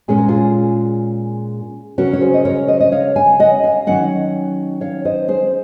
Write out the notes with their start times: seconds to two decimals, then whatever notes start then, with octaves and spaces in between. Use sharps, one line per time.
0.08 A#2 G#3 C#4 G#4
0.18 A#4
0.28 F4 G#4
1.98 C#3 F#3 C#4 F#4 A#4
2.13 C#5
2.21 G#4 C5
2.34 D#5
2.45 A#4 C#5
2.68 C5 D#5
2.80 D#5
2.92 C#5 F5
3.16 F5 G#5
3.39 D#5 F#5
3.63 F5 G#5
3.87 D#3 F#3 C#4 D#5 F#5
4.81 C#5 F5
5.05 C5 D#5
5.28 G#4 C5